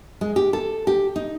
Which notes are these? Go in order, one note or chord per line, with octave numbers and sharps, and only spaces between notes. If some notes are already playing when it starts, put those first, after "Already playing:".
G#3
G4
A4
G4
D#4